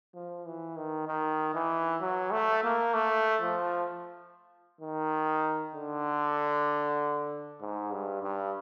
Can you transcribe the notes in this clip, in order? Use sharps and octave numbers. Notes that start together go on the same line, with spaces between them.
F3
E3
D#3
D#3
E3
F#3
A3
A#3
A3
F3
D#3
D3
G#2
G2
G2